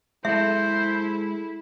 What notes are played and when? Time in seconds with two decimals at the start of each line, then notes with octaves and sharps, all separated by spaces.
0.25 G#3 E4 A4 C5 E5